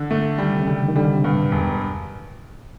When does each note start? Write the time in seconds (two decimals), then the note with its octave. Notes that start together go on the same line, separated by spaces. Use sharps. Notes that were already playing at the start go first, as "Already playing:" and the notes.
Already playing: D3 E3
0.11 A3
0.38 D#3 G3
0.53 C3
0.60 C#3
0.67 D3 G3
0.88 D#3
0.96 D3 G3
1.14 C3
1.24 G2
1.33 A#2
1.52 E1 A2